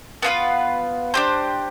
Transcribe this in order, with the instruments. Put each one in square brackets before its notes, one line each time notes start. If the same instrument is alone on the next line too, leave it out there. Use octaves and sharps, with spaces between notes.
[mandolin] B3 F4 B4 F5
D4 G4 C5